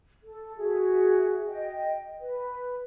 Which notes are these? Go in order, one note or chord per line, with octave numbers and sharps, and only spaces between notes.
A4
F#4 G#4 E5
D#5 G5
B4